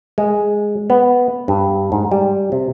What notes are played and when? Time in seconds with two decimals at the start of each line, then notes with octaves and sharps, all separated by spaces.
0.18 G#3
0.90 B3
1.48 G2
1.92 G#2
2.11 G3
2.52 C3